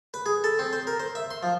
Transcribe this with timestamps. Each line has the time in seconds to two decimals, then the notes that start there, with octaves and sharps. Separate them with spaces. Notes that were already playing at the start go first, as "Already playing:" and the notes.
0.14 B4
0.26 G#4
0.44 A4
0.59 C4
0.73 C5
0.87 A#4
1.00 C5
1.15 E5
1.31 C6
1.43 F3